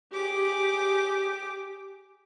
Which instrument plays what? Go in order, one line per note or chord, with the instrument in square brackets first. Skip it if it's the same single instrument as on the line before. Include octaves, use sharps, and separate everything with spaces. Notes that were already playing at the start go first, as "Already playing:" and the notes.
[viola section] G4 [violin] G#4 D6